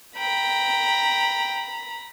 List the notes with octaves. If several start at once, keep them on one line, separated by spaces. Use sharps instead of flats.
G5 A#5 B5